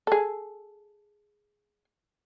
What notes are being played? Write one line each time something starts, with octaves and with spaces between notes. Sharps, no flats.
G#4 A4